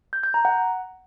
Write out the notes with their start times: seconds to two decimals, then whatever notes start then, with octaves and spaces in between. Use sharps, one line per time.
0.13 G6
0.24 G6
0.34 A#5
0.45 F#5